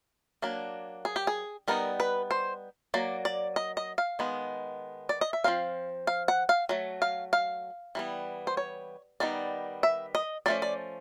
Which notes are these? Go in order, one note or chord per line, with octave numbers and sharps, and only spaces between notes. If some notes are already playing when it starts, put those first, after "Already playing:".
F#3 A#3 D4
G#4
G4
G#4
G3 B3 D#4 A#4
B4
C5
F#3 A#3 D5
D5
D#5
D#5
F5
D#3 G#3 B3
D5
D#5
E5
F3 G#3 C4 F5
F5
F#5
F5
F#3 A3
F5
F5
E3 G3 B3
C5
C#5
D#3 G3 B3 D#4 D5
E5
D#5
F3 A3 C#4 D5
D5